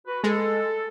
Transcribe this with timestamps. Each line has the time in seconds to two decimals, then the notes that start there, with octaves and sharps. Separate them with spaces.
0.07 F#4 B4
0.24 G#3 A4